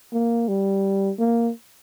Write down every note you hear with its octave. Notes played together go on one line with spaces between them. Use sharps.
A#3
G3
A#3